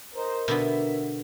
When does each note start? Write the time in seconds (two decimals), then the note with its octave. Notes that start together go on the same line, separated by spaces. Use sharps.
0.15 D#4 A#4 C5
0.48 B2 D3 B3 E5